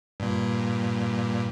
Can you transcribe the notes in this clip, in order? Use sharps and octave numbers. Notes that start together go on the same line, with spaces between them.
G2 A#2